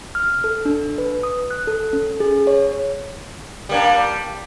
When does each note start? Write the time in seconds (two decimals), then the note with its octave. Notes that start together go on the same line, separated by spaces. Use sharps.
0.15 F6
0.44 A4
0.65 D4
0.98 B4
1.23 D#6
1.50 F#6
1.67 A4
1.93 C#4
2.20 G#4
2.47 C#5
3.69 G3 A#3 D4